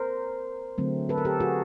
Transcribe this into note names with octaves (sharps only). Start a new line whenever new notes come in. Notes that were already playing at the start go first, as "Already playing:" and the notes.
Already playing: A#4 C5
D3 F#3 A3 C4
A4 B4
A#4
G4 A4
F#4 G#4